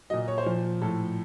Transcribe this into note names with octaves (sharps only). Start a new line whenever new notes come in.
A#2 F#3 D#5
C#5
C5
A#2 F3
A2 F3 A4